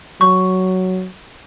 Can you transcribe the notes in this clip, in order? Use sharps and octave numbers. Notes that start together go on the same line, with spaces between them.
F#3 C#6